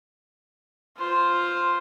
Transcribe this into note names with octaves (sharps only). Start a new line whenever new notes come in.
F4 C5